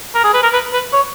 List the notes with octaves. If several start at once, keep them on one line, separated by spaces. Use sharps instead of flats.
A#4
G#4
B4
A#4
B4
B4
C#5